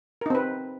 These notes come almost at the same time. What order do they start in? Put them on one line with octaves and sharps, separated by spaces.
A#4 D#4 C4 B4